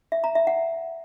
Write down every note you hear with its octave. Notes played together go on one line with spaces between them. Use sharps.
E5
A#5
E5
F#5